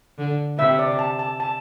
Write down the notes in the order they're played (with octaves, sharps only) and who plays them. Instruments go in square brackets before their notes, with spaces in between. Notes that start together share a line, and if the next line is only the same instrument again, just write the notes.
[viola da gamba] D3
[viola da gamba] C3 [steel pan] E5
[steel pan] D5
A5
A5
A5